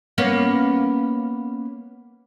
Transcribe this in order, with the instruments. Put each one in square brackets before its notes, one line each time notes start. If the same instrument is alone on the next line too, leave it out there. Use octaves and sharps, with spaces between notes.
[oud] A#3 B3 C#4